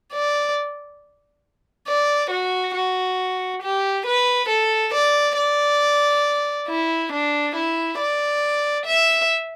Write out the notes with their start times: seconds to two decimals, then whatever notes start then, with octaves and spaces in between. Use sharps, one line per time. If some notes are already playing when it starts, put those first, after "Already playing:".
0.13 D5
1.87 D5
2.31 F#4
2.75 F#4
3.63 G4
4.06 B4
4.49 A4
4.94 D5
5.36 D5
6.68 E4
7.12 D4
7.56 E4
7.99 D5
8.86 E5